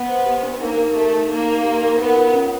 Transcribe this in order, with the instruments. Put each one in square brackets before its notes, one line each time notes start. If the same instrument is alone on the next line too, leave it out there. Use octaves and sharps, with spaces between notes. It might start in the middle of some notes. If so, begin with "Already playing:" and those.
Already playing: [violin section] B3
[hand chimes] C5
G4
D4
[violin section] A#3 [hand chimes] D#4
[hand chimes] A#4
[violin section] A3 [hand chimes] G4
[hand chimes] D#4
[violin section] A#3 [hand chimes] D#4
[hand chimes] A#4
G4
D#4
[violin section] B3 [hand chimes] A#4
[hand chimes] F4
C#4